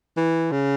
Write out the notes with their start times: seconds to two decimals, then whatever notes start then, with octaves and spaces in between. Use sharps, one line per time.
0.17 E3
0.52 C#3